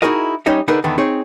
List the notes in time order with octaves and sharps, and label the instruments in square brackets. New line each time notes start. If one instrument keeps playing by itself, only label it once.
[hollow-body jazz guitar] D#4 E4 F#4 G#4 A#4 D#5
G3 C#4 D#4 C#5 D#5 E5
D3 D#4 G#4 A#4 B4
E2 D3 D#3 B3
C4 D#4 G#4 C#5